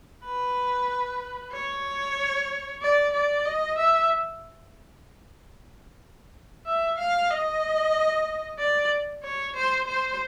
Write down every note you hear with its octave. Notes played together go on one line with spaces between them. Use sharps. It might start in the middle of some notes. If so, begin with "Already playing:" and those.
B4
C#5
D5
D5
D#5
E5
E5
F5
D#5
D5
C#5
C5
C5